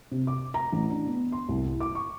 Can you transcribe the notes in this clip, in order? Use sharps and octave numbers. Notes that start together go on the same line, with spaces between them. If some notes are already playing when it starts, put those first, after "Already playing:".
C3
D6
A#5
A1
D4
B3
C6
C2
E4
D6
C#6